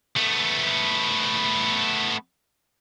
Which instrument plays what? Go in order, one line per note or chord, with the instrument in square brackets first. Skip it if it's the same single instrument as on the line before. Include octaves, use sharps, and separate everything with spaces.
[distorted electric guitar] A3 B3